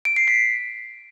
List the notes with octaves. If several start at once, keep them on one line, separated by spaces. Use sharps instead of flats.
D7
C7
B6